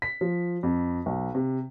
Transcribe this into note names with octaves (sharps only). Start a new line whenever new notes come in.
B6
F3
F2
B1
C3